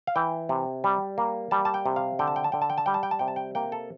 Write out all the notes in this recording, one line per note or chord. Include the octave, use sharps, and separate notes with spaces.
F5
E3 G5
C3
G3
A#3
G3 A5
A5
G5
C3
F5
D3 G5
A5
G5
A5
D3 G5
A5
G5
A5
G3 G5
A5
G5
A5
C3 G5
A5
G5
A#3 G5
A4